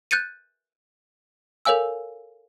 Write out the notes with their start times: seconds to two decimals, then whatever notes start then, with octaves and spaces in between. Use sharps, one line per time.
0.11 F#6 G6 A6 C#7 D#7
1.65 A4 A#4 C#5 F5 G#5 E6